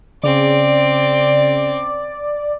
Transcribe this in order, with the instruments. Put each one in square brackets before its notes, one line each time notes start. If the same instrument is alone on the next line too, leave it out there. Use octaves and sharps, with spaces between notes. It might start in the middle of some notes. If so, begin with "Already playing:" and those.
[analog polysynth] C#3 [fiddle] C4 D6 [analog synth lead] D5